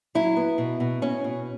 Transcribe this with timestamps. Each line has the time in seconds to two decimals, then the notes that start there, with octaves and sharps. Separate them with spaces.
0.15 F#3 E4
0.37 B3
0.58 B2
0.80 B2
1.02 B2 C#4
1.24 B2